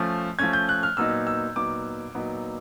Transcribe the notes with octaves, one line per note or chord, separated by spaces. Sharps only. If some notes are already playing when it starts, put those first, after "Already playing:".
Already playing: F3 A3 C#4
F3 A3 C#4 G#6
G6
F#6
F6
A#2 F#3 B3 D#4 E6
E6
A#2 F#3 B3 D#4 D6
A#2 F#3 B3 D#4